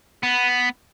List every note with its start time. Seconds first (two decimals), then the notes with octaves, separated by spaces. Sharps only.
0.23 B3